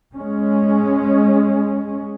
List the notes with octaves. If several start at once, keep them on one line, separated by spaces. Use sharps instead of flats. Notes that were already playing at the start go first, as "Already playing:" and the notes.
G#3 C#4